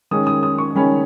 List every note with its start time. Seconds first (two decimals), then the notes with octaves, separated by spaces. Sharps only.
0.11 D#3 G#3 C#4 D#6
0.27 D#6
0.43 D#6
0.58 C#6
0.75 D#3 G#3 C#4 B5